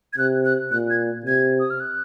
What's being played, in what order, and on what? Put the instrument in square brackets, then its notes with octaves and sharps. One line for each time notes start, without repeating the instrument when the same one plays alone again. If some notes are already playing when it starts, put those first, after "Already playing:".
[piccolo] G#6
[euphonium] C3 [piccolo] F#6
[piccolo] F#6
[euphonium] A#2 [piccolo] F#6
[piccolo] G#6
[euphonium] C3 [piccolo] G#6
[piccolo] D#6
F6
F#6